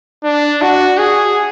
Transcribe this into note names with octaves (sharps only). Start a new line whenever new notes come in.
D4
F#4
G#4